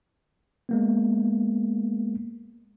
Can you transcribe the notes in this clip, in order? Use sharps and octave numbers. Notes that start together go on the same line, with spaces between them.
G#3 A#3 B3